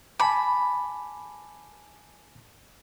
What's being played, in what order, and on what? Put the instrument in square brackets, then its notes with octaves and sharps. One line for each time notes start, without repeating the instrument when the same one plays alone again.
[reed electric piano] G#5 A5 D6 [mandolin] B5